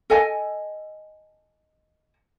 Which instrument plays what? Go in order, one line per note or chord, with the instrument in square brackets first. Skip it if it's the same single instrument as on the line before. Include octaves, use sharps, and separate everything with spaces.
[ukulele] A4 D#5 G#5